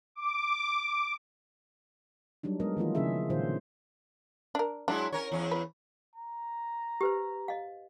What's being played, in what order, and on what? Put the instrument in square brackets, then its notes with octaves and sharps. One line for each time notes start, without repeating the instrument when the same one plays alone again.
[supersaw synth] D6
[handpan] F#3 G3 D4 D#4
G3 G#3 B3 A#4 D#5
D#3 E3 A#3 F4
C#3 F3 C#4 E4 G#4 E5
A#2 D3 D#3 F4 C5
[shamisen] D4 A#4
[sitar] F#3 G#3 E4 [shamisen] D4
[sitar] C#4 A#4 C#5
E2 C#4
[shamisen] B4
[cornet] A#5
[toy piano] G4 B4 C5
D#5 F5